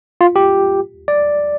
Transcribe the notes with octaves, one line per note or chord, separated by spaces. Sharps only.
F4
G4
D5